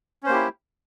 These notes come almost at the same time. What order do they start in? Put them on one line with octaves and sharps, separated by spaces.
C#4 C5 A#3 G4 E4